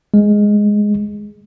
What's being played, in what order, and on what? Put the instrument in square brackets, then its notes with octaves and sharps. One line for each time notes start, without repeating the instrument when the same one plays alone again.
[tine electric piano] G#3